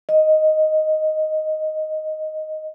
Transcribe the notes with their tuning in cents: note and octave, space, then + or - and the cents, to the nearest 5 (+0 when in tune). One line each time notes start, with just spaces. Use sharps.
D#5 +0